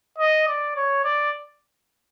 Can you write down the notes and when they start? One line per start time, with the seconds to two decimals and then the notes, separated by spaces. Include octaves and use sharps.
0.18 D#5
0.48 D5
0.76 C#5
1.04 D5